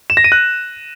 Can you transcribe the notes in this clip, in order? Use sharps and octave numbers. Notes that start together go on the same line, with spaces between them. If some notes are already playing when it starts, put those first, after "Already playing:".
E7
A#6
D#7
F#6